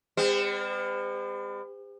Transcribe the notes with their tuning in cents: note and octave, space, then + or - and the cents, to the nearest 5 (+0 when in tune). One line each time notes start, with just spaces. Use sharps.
G3 +45 C4 -35